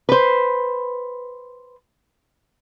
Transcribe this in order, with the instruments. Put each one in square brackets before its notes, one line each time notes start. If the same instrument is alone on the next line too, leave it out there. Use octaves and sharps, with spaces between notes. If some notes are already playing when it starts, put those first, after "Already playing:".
[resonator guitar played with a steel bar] B4 C5